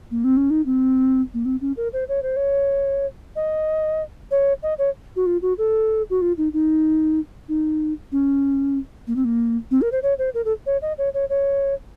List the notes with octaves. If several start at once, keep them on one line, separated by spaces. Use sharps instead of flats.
A#3
C4
C#4
D#4
C4
A#3
C4
C#4
A#4
C5
C#5
C5
C#5
D#5
C#5
D#5
C#5
F#4
F4
F#4
A4
F#4
F4
D#4
D#4
D#4
C#4
A#3
C4
A#3
C4
A#4
C5
C#5
C5
A#4
A4
C#5
D#5
C#5
C#5
C#5